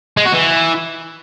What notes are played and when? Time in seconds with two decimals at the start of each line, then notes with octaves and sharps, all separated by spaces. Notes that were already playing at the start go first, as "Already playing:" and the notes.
0.17 G#3
0.26 F#4
0.34 E3